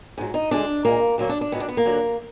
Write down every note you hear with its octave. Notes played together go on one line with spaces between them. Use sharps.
G#2 F#3
D#4
D2 D3 G#3 D4
A#2 G#3 A#3
D2 D3 F#3 A#3
D4
D4
G#2 D#3 F#3 B3
D4
B3
A#3
F#2 D3 F#3